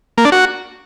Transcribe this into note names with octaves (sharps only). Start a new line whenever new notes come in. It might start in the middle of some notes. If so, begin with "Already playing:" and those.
A#3
D4
F#4